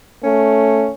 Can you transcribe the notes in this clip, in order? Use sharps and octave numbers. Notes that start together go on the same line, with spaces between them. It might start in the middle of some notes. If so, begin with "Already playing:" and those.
A3 C#4